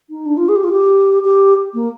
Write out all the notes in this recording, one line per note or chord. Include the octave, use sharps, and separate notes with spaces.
D#4
D4
F4
G#4
G4
F4
G4
G4
A#3